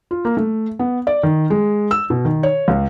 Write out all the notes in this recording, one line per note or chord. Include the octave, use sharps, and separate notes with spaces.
F4
A#3
A3
B3
D5
D#3
G#3
E6
B2
D#3
C#5
C#2